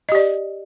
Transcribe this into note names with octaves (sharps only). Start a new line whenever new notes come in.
G4 D5 D#5